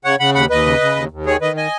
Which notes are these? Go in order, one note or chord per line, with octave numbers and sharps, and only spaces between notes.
C#3 C#5 F#5
C#3 F#5 B5
D#2 F#5 B5
D#2 B4 D#5
C#3
C#3
D#2
D#2
D#3 G#4 C#5
D#3 B4 D#5
D#5 G#5